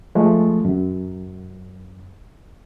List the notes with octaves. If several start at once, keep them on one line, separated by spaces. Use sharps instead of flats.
F3 G#3 A3
F#2